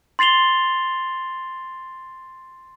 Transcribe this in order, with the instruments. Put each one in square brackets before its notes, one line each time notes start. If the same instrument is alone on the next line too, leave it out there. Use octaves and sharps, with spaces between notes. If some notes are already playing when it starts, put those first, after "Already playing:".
[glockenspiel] C6 A6 C7 F7 G7